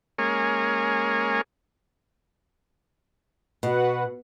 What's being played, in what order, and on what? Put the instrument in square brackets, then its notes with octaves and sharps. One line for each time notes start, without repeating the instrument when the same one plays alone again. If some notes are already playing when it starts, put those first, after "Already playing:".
[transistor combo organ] G#3 A#3 C#4 G#4 A#4 C#5
[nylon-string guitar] B2 [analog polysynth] F#4 B4 F#5